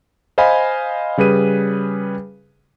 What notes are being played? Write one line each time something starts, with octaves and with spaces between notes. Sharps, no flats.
C5 D#5 F5 G#5 B5
C#3 G3 G#4 B4 D#7